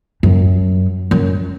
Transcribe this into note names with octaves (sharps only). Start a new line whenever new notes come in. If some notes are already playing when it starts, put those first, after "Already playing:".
F#2
F#2